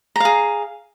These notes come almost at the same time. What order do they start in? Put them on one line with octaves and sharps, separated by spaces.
A#5 F5 G#4